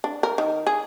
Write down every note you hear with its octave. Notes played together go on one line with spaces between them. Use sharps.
D4
A#4
D#3
G#4